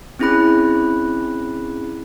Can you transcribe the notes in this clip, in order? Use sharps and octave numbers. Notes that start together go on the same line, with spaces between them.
C4 C#4 E4 G#4 B5 F#6